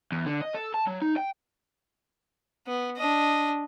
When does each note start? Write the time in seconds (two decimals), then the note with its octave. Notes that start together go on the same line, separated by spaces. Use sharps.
0.12 E2
0.26 D3
0.41 D#5
0.55 A4
0.74 A5
0.87 F#3
1.02 D#4
1.17 G5
2.67 B3
2.97 D4 D#5